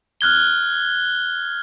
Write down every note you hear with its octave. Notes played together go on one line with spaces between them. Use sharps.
F6 F#6 G#6 G7